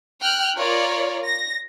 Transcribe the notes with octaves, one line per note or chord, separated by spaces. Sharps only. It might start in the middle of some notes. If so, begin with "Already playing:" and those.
G5 F6 F#6
F4 A#4 C#5 D5
A#6